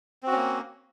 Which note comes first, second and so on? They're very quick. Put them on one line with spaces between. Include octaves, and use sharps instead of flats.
C4 F#4 C#4 A#3